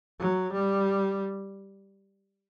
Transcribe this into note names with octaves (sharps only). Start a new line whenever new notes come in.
F#3
G3